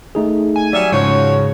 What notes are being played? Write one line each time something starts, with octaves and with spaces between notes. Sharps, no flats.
A3 D#4 G#4
G#5
F#3 G3 D5 E5
G#2 C#3 F3 F#4 C#5